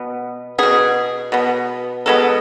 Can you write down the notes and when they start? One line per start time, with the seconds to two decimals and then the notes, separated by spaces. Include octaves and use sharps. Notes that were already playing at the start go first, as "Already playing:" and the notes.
Already playing: B2 B3
0.58 B2 B3 G#4
1.32 B2 B3
2.06 B2 G#3 B3 A4